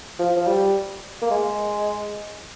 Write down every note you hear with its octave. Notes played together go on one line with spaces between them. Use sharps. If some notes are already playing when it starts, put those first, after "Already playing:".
F3
F3
G3
A#3
G#3